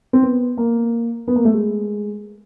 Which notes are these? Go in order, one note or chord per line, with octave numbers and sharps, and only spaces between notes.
C4
B3
A#3
B3
A#3
A3
G#3